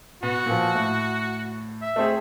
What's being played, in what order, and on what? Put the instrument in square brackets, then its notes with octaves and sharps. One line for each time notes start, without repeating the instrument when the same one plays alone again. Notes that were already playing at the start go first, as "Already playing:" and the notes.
[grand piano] B2 B3 [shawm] F#4
[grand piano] A#2 F3
A2
[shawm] E5
[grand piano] A3 C4 G#4